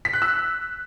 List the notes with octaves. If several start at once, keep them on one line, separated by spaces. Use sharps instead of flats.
B6
F#6
E6